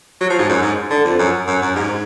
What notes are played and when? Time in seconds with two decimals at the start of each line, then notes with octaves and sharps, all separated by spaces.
0.21 F#3
0.30 F3
0.39 G#2
0.49 F#2
0.62 G#2
0.90 D3
1.04 F2
1.19 F#2
1.47 F#2
1.62 F#2
1.75 G#2